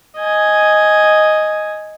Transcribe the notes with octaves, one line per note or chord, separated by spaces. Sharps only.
D#5 G#5